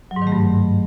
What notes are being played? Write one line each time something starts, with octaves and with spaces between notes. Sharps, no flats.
F#3
G#2
D#3
A3
G2